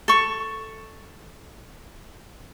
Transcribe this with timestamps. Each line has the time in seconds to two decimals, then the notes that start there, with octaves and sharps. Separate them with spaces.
0.08 A4 C#6